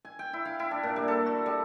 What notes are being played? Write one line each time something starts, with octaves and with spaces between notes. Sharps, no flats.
G#5
G5
E4
F5
E4
D4
A#2
G3
A4
F#4
G3